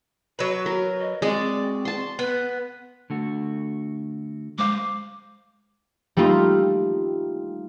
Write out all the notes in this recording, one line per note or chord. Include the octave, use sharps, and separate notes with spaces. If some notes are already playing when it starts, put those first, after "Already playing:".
F#3 F#4 B4
A#4
D#5
G#3 C4 F#4 D5
A5 C6
B3 B4
D3 A3 F#4
G#3 C5 F5 D6
G3 A3 A#3 D#4 F4